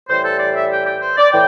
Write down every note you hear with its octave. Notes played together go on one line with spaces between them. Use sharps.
A2 E3 G3 C5
A4
D5
E5
G5
G5
C5
D5
A2 E3 G5